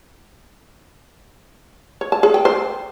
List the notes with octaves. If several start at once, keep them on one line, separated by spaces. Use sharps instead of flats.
C#5
A5
G#4
G5
C5